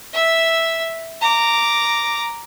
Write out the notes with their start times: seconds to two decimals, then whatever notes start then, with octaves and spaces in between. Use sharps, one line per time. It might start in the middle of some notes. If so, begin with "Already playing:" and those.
0.13 E5 E6
1.21 A#5 D6